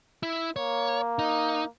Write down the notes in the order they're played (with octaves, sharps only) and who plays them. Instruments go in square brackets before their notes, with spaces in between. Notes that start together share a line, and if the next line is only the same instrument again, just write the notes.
[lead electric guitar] E4
[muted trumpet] A#3 [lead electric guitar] C#5
[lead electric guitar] D#4